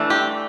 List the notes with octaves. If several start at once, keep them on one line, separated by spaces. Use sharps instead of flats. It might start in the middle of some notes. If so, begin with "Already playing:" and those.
Already playing: E3 A3 D4
G4